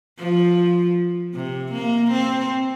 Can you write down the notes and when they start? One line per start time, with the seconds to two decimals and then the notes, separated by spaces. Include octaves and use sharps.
0.19 F3
1.34 C3
1.72 A#3
2.12 C4